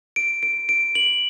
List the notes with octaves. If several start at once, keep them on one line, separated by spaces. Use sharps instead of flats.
D7
D7
D7
F#7